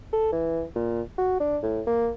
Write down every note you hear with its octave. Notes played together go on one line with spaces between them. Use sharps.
A4
E3
A#2
F#4
D4
A2
A#3